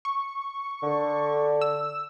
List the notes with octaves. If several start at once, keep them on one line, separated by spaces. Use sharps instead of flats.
C#6
D3
E6